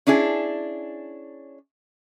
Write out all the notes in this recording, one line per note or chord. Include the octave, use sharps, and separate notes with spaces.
C#4 D4 E4 G#4